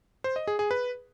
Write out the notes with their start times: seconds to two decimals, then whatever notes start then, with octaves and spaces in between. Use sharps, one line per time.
0.24 C5
0.36 D#5
0.47 G#4
0.59 G#4
0.71 B4